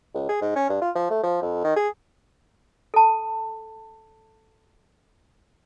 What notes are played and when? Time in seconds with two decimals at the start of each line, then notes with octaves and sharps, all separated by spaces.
0.15 C#2
0.29 G#4
0.42 G#2
0.56 C#4
0.69 G2
0.82 F4
0.95 F3
1.10 A3
1.23 F3
1.42 F2
1.64 D#3
1.76 G#4
2.94 A4 A5